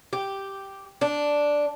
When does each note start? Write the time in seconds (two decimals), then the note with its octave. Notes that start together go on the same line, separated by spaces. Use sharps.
0.13 G4
1.01 D4